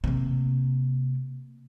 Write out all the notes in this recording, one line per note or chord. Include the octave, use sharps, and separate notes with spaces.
C3 A#3